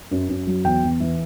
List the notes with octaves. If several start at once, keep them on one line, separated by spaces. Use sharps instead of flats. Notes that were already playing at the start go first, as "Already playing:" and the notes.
F#2
F#2
F#3
E2 G5
E2
E3